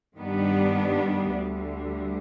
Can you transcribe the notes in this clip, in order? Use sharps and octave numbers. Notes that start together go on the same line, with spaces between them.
G2 D#3 G3 B3 D4
D2 D3 G3